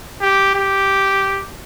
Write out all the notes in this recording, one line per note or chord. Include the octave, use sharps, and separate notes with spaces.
G4
G4